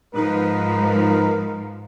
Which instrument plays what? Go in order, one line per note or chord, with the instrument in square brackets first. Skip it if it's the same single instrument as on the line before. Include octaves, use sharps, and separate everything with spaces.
[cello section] G#2 F3 [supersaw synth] D#4 B4 [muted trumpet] A#4